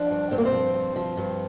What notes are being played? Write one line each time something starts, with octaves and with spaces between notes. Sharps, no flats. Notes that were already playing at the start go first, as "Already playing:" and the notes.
Already playing: F3 D4
G2
G2 C4
A#3
C4
F3
G2
F3
G2